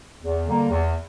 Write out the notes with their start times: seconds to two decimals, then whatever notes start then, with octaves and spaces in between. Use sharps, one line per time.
0.23 E2
0.47 D3 G3 A#3
0.70 E2